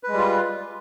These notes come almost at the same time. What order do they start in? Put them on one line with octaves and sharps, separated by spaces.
B4 G#3 G3 F4